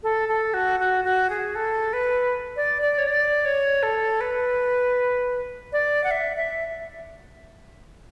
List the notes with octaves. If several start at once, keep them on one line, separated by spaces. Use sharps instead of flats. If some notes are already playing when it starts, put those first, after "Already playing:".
A4
A4
F#4
F#4
F#4
G#4
A4
B4
D5
D5
C#5
D5
C#5
A4
B4
D5
F#5
E5
E5